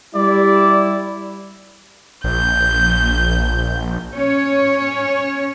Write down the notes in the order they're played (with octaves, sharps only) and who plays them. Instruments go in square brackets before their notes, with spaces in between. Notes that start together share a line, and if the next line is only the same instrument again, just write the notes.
[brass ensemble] G3 E4 [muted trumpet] D5
[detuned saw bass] A#1 [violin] G6
[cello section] C#4 C#5